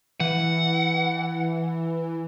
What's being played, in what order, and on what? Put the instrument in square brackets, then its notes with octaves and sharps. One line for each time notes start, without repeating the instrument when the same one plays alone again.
[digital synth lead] E3 [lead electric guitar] F#5